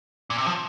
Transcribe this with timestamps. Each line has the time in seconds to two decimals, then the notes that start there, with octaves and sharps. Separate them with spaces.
0.30 A#2
0.38 C3
0.46 F3